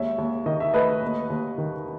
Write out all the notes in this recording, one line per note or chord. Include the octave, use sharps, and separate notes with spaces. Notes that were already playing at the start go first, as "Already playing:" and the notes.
Already playing: D#2 G#3 C#5 E5
D#2
D#3 D#5
E5
A3 B4 D#5
D#2
D#2
D#3